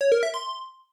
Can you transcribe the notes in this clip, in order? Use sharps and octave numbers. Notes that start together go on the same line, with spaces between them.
C#5
A#4
E5
C6